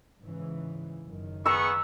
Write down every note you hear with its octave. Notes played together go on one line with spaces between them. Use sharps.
G#2 C#3 E3
F#1 F#2 D#3
B3 G#4 A#5 C#6 E6